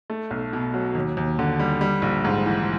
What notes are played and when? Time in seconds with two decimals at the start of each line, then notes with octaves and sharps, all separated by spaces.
0.10 A3
0.31 B1
0.53 B2
0.74 F#3
0.95 D#2
1.17 D#2
1.39 D3
1.60 G3
1.81 G3
2.02 A#1
2.25 G#2
2.46 E3